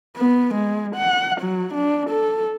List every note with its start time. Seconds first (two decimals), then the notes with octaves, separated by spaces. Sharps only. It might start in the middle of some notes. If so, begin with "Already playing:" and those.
0.17 B3
0.54 G#3
0.96 F#5
1.41 F#3
1.74 D4
2.10 A4